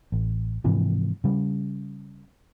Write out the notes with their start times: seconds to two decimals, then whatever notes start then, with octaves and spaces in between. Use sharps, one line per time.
0.12 A1
0.64 G#2 C3 E3 F3
1.24 C#3 G3